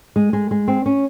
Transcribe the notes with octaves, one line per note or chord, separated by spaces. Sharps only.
G#3
G#3
G#3
C4
C#4